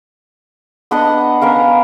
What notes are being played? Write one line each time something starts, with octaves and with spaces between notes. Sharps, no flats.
B3 D4 D#5 F#5
B3 C#4 A#4 F5